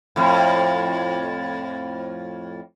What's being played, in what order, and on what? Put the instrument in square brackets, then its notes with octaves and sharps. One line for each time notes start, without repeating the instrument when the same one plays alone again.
[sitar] F2 A2